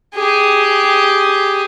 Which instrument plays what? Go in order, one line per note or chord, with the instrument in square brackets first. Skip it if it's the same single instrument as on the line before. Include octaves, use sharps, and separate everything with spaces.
[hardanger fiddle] G4 G#4